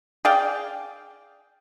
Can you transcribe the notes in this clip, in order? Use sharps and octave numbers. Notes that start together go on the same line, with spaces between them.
G#4 D5 F5 G5